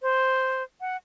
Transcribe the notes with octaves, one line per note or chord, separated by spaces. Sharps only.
C5
F#5